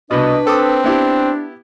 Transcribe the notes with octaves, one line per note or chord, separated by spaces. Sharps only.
C2 B2 D4 B4 D#5
C4 A4 D6 D#6
B3 D4 E4 G4